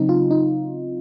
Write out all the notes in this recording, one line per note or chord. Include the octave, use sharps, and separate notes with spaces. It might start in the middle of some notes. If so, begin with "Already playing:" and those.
Already playing: C#3 F#3 C4 D#4
F4
D#4